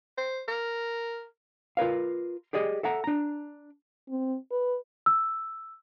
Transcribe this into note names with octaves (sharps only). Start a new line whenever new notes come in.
C5
A#4
F4 A#4 B4 F5
G4 G#4 D5 D#5
A4 E5 F#5 A#5
D4 A#5
C4
B4
E6